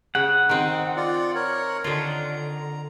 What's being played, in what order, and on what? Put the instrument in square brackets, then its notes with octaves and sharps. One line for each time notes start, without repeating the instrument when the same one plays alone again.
[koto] C#3 [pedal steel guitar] F#5
[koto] D#3 C4 [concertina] D#4
[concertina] F4 D5
A#4 C#5
[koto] D3 D#3 F4 [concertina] A#5